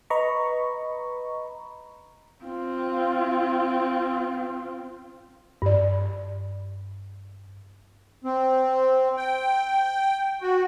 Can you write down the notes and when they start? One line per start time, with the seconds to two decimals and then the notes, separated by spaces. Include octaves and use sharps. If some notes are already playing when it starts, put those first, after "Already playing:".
0.10 B4 D#5 A#5 B5 C#6
2.44 C4 F4
5.62 G2 D5
8.24 C4
9.17 G5
10.42 F#4